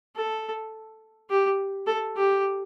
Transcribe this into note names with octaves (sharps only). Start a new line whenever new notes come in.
A4
G4
A4
G4